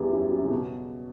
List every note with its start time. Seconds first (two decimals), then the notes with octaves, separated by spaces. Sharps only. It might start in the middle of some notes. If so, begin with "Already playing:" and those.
Already playing: E2 G2 E3 G3
0.11 F#2 F#3
0.32 F#2 F#3
0.43 C#3
0.51 B2